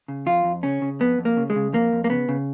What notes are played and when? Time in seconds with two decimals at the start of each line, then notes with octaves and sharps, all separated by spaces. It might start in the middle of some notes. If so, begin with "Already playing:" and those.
0.08 C#3
0.26 F2 F4
0.44 F2
0.63 C#3 C#4
0.82 C#3
1.00 F2 B3
1.19 F2
1.25 A#3
1.37 C#3
1.50 G#3
1.56 C#3
1.73 F2 A#3
1.93 F2
2.04 A#3
2.10 C#3 B3
2.29 C#3